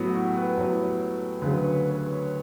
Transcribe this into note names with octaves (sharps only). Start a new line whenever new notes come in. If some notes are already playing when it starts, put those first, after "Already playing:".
Already playing: A2 F#3 B3
F#4
G4
B4
A2 F#3 B3 C#5
D2 C#3 F#3 B4
C#5
B4
C#5